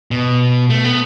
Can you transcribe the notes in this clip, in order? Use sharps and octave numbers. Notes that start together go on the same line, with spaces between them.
B2
A3
B3